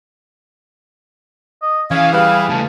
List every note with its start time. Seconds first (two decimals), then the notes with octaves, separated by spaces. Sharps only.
1.62 D#5
1.91 E3 C#4 G#4 F5 G#5
2.13 G3 G#4 B4 F5
2.50 C#3 A3 A5